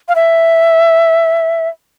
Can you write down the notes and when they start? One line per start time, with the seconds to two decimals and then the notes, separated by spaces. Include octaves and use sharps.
0.08 F5
0.15 E5